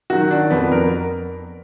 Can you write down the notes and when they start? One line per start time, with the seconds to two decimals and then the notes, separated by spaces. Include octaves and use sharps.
0.10 D#3 F#3 F#4
0.31 D4
0.51 F2 B3
0.72 A#4